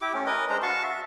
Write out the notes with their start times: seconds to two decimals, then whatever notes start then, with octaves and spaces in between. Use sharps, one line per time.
0.01 E4 G4 D6
0.14 A3 C#4
0.26 A#4 B4 D#5
0.49 G#3 D4 C5 A#5
0.62 F#4 F5 A5 C#6
0.83 E5